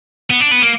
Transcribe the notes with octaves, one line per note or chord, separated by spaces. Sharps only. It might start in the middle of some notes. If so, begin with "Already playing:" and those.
B3
D4
B3
A#3